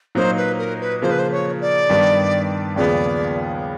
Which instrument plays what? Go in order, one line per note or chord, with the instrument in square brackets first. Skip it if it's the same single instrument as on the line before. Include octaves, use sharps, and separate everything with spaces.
[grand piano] A#2 F#3 A#3 D#4 [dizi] C5
[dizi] B4
A#4
B4
[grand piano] C#3 F3 A#3 [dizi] C5
[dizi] B4
C5
C#5
D5
[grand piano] G2 D#3 G3 B3
[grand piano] D#2 C#3 F3 G#3 B3 [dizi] D5